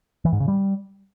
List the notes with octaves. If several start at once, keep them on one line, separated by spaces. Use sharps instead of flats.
E3
G#2
C#3
G3